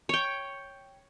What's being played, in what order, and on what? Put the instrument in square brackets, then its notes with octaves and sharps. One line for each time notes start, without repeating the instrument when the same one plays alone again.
[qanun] C#5 G5